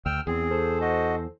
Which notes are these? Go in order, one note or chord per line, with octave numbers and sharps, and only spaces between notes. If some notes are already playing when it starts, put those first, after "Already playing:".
D2 G5 E6 F6
E2 C4 G#4
A4 C5
F#4 D#5